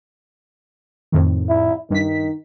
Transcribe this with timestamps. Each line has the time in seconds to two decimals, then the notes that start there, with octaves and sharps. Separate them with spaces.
1.12 F2 A2 D#3
1.49 E4
1.91 G2 D#3 B6